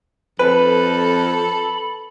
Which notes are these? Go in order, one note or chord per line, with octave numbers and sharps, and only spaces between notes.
F2 A4 B4 B5